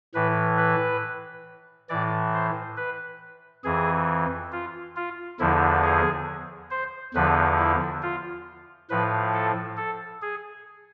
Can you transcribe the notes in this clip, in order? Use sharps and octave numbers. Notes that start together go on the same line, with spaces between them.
A2 E3 B4
B4
A2 E3 D5
C5
B4
F2 E3 G#4
F4
F4
E2 D3 F3 E4
G#4
C5
E2 D3 F3 B4
E4
F4
A2 F3 B4
A4
A4
G#4